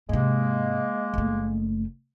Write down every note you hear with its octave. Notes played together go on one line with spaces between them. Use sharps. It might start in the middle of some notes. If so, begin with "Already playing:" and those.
G#2 C3 G#3 A#3
F#1 A3